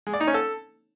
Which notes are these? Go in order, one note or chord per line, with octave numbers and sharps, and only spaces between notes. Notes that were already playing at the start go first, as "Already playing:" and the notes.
G#3
D5
D#4
C#4
A4